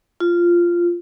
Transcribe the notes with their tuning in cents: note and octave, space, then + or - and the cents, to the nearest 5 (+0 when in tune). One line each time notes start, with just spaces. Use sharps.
F4 -10